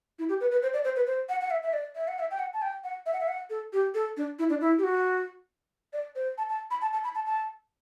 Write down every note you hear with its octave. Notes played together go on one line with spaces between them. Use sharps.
E4
G4
B4
B4
C5
D5
C5
B4
C5
F#5
F#5
E5
E5
D5
E5
F#5
E5
G5
F#5
A5
G5
F#5
E5
F#5
E5
F#5
A4
G4
A4
D4
E4
D4
E4
G4
F#4
D5
C5
A5
A5
B5
A5
A5
B5
A5
A5